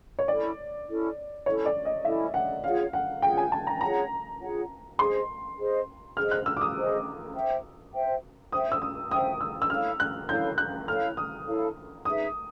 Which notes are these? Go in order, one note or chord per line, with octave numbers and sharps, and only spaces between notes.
C#5
C#4 E4 A4 D5
C#4 E4 A4
C#4 E4 A4 C#5
D5
D#5
C#4 E4 A4 E5
F#5
F4 G#4 C#5 F5 F#5
F#5
F4 G#4 C#5 F#5 G5
G#5
A5
A#5
F4 G#4 C#5 F#5 A#5
F4 G#4 C#5 F#5
G#4 C5 D#5 C6
G#4 C5 D#5
G#4 C5 D#5 F6
F#6
E6
D6
D#6
G#4 C5 D#5
C5 E5 G5
C5 E5 G5
C5 E5 G5 D#6
E6
D#6
C5 E5 G5 D#6
E6
E6
E4 A4 C#5 F5 F6
F#6
E4 A4 C#5 F5 G6
F#6
E4 A4 C#5 F5 F6
D#6
E4 A4 C#5 F5
D#4 G#4 B4 E5 D#6